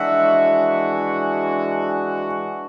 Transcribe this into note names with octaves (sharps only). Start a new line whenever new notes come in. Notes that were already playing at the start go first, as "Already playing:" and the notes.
Already playing: E3 G#3 D4 F#4 E5